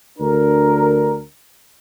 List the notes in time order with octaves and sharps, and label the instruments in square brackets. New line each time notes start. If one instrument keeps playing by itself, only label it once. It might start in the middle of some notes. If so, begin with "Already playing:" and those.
[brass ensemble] D2 D4 A#4